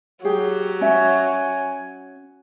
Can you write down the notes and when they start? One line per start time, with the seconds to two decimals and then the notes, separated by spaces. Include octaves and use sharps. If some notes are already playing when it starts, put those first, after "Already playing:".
0.25 F#3 G4 G#4 G5
0.81 C#4 E5 G#5